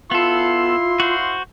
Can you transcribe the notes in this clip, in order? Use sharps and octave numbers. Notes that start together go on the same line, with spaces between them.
B3 E4 F4 A4 F5 C6
F#4 C5